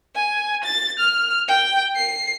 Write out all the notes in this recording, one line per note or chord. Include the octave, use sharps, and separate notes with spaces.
G#5
A6
F6
G5
C7